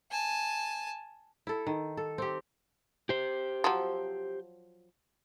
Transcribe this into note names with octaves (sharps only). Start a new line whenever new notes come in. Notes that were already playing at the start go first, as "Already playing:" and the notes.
G#5 A5
E4 A4
D#3
A4
C4 G4
G4 C5
F3 F#3